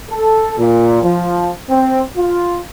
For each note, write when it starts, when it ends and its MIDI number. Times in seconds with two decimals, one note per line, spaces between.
0.10 0.54 69
0.58 0.99 46
1.03 1.51 53
1.70 2.01 60
2.17 2.58 65